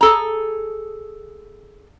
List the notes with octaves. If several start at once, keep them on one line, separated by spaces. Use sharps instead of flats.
G#4 A4 A#5